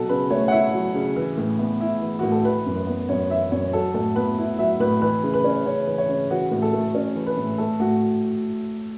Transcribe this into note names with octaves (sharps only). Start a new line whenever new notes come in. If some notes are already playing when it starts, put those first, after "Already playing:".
Already playing: B2 F#3 A4
C#3 B4
A3 C#5
F#5
E4 E5
F#3
C#3
E3
A2
B3
E4
E3
A2 F#4
A4
E3 B4
F#2
B4
B3
F#2 C#5
E3 E5
F#2 C#5
F#3 A4
A2 A4
B3 B4
E4
F#3 E5
A2 B4
E3 B4
C#3
B4
C#4
C#3 C#5
E3
C#5
C#3
E3 F#4
A2
A4
A3
C#4
E3
B4
A2
A3 A4
A2 F#4